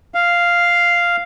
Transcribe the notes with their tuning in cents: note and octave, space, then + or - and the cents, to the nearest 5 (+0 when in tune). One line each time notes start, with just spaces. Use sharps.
F5 -5